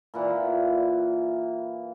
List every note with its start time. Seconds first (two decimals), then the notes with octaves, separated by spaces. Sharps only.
0.14 A#2 E3 F#5